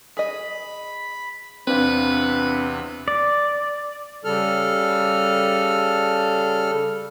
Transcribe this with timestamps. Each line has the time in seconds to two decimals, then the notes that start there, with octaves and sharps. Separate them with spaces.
0.17 G#4 D#5 B5
1.67 E2 C3 C4 D4 B4 F5
3.08 D5
4.24 C#3 G3 A4 F6